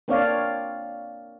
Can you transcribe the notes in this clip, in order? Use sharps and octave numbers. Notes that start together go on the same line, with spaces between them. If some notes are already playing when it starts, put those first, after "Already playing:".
A#3 C4 D4 C#5 D5 F5